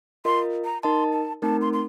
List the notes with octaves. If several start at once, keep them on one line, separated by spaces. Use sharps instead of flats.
F4 A#4 D#5 C6
A#5
D#4 A#4 D#5 A5 C6
A5
A3 C4 D#4 A#4 A5
C6
C6